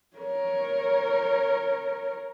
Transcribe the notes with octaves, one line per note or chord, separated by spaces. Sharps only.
A#4 C#5